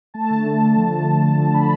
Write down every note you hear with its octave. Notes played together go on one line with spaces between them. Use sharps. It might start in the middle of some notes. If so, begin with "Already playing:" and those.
A3 A5
D3
D3
D3
F3
D3
A3
D3
D3
D3 B5